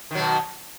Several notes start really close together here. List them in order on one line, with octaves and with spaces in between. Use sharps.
D#3 F#3 B2